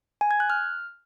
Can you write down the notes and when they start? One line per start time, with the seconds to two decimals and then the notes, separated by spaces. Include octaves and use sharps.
0.21 G#5
0.31 G#6
0.40 F#6
0.50 F6